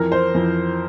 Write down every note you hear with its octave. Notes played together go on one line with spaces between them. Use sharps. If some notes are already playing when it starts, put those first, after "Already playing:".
Already playing: F2 E3 A#4
C5
F2 E3